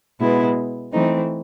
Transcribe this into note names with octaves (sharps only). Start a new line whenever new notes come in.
B2 G#3 B3 E4
E3 A3 C4 D#4